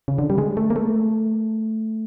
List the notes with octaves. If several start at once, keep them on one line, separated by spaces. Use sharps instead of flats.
C#3
D3
G3
G#3
A3
A#3
A3